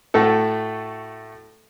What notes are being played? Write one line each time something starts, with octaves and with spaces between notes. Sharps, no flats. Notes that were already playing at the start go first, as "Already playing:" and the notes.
A2 A3 F#4 A4